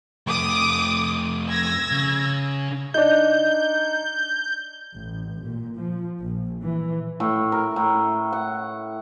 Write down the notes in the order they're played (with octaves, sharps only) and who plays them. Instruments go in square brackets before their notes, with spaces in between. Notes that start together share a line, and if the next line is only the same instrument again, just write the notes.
[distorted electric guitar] F2 A3 [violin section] D6 D#6
[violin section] E6 G#6 A#6
[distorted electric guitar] C#3
[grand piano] D4 D#4 [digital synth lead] G6
[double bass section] A1
A#2
F3
A#1
E3
[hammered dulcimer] A2
A#4
A2
F#5